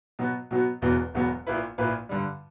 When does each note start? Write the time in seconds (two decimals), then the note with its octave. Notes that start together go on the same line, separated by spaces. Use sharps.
0.19 B2 F#3 B3
0.51 B2 F#3 B3
0.82 E1 E2 B2 F#3 B3
1.14 E1 E2 B2 F#3 B3
1.47 A#1 A#2 A#3 E4 B4
1.78 A#1 A#2 A#3 E4 B4
2.09 G2 D3 G3